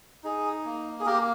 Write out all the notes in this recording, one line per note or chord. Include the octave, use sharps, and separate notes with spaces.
D#4 G#4
A#3
G#4
A#3 G4 A#4